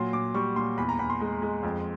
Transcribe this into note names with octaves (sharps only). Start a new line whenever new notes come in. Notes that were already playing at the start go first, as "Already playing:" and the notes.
Already playing: A#2 F#3 C6
A#2 D6
G3 C#6
A#2 C6
E2 B5
A#5
E2 B5
C6
G#3
G#3
F2